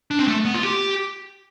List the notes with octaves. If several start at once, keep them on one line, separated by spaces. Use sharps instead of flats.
D4
C4
A3
B3
F4
G4